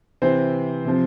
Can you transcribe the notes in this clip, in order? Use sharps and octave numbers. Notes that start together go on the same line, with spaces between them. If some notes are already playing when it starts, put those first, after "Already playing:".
C3 E3 C4 C5
C3 F3